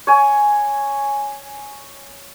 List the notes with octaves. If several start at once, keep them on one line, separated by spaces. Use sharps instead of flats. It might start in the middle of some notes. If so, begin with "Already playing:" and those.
C#5 G#5